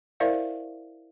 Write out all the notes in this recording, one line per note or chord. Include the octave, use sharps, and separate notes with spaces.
E4 A#4 C5 D5 E5 F5